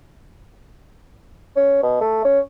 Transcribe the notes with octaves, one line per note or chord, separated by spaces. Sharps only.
C#4
B2
A3
C#4